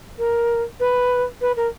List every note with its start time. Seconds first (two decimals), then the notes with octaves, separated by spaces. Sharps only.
0.18 A#4
0.80 B4
1.41 B4
1.56 A#4